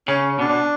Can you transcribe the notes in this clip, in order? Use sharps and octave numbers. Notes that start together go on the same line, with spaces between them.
C#3 C#4
B2 D4
B2